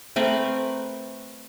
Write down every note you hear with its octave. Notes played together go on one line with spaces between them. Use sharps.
A3 C4 A#4 B4